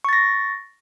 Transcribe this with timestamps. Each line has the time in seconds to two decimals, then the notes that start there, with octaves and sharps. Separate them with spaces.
0.04 C#6
0.09 A6
0.13 A#6